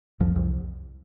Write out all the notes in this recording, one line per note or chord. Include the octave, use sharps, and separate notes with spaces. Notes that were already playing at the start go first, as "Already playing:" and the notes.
C2 F2 F3
C2